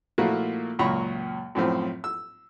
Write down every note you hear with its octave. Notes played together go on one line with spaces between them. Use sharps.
A#2 F3 A3 A#3 E4 F#4
C#2 F#2 A#2 A#5 B5 C#6
F#2 A2 F3 C4
E6